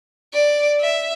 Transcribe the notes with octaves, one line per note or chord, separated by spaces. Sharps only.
D5
E5